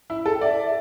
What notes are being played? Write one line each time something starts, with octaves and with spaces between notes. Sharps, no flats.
E4
A4
G5
D5 E5